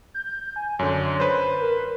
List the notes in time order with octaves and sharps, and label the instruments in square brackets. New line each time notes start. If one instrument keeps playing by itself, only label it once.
[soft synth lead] G6
G#5
[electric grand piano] F#2 D3 [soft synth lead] C#5
[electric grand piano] B4 C5
[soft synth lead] A#4